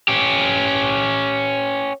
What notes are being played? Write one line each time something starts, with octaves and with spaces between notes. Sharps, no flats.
C#4 G4